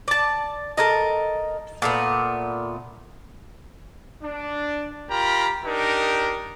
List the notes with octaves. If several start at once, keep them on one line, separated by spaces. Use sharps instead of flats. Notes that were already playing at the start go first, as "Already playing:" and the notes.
D5 A5
A4 A#4 D#5
A#2 A3 B3
D4
F4 G4 A#4 A#5 B5
D4 D#4 G4 A#4